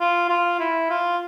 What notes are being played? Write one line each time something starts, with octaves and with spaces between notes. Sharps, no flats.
F4
F4
E4
F4